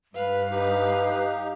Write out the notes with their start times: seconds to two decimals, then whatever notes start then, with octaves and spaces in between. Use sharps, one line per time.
0.15 G2 B4 F5
0.51 D#4 G4 B4